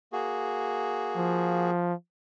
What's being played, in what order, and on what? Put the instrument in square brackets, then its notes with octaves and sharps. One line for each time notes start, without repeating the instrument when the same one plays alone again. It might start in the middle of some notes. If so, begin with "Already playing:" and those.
[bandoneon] A#3 F#4 G#4
[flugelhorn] F3